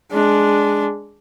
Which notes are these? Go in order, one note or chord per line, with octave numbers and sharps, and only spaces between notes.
G#3 D4